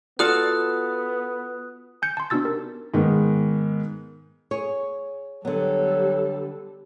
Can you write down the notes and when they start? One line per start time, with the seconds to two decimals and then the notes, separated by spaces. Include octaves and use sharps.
0.19 B3 F4 F#4 A4 D5 D#6 F#6
2.02 G#5 G6 C#7
2.17 A5 C6
2.30 B3 D4 D#4 F#4 E6 A6
2.43 D#4 G4 A#4
2.94 G#2 D#3 G#3 B3
4.51 G#4 C#5
5.45 D3 F#3 G3 B3 A4